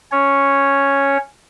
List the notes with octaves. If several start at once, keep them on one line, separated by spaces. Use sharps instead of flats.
C#4 C#5